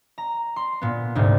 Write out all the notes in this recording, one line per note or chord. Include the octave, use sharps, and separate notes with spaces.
A#5
C6
A#2 B3
D2 G#2 C3